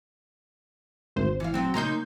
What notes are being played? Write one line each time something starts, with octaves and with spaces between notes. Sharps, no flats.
G#1 D2 C5
E3 F5
F#3 C4
C#3 A#3 D#4 A#5 C6 G6